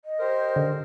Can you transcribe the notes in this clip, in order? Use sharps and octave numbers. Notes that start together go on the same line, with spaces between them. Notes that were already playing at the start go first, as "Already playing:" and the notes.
D#5
G4 A#4 C5
D3